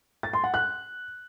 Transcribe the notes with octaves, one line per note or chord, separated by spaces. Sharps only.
A6
C6
F#5
F#6